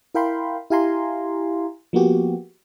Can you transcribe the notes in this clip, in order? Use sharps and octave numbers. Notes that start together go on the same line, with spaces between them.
E4 A#4 F5 G5 B5 C6
E4 G4 F5 G#5 A#5 C6
F3 A#3 B3 F#4 G4